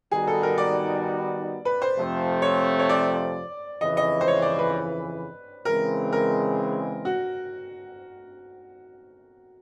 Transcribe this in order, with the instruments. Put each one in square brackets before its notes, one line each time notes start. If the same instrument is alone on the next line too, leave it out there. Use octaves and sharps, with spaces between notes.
[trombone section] D#3 G3 B3 D#4 F#4 [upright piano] G#4
[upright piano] A4
A#4
D5
B4
C5
[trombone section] F2 C3 F3 A3 C4
[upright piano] C#5
C#5
D5
[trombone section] F2 C#3 E3 [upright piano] D#5
[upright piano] D#5
C5
C#5
D5
B4
[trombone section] C#3 E3 G#3 C4 [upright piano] A#4
[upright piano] A#4
F#4